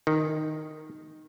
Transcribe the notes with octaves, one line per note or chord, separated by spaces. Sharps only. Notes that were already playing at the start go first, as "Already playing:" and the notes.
D#3